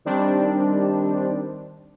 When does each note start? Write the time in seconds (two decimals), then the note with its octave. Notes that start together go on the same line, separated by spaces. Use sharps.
0.05 D#3 G3 C4 D4